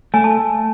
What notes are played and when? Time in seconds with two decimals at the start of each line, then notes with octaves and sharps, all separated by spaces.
0.14 A3 G#5
0.24 A5